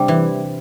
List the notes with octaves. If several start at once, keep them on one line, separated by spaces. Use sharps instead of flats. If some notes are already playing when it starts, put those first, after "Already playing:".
Already playing: C3 G3 D4 G4
E3